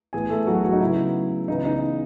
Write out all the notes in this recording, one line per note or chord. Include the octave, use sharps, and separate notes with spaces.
A2 E3 B3 G#4 G#5
A3 A4
F#3 F#4
F#3 F#4
D#4
C#3 F#3 B3 E4
C#3 E3 B3 D#4
D#4